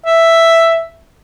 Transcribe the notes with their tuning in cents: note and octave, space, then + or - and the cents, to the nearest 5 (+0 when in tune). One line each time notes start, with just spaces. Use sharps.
E5 +5